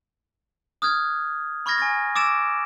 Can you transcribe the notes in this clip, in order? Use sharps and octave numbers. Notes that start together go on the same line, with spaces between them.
D#6 F6 F#6 G#6
B5 C#6 F6 G#6 A#6
G#5 C#6 A6
D6 E6 A6 D7 E7